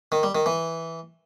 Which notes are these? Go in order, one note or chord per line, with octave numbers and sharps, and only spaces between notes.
D#3
G3
D#3
E3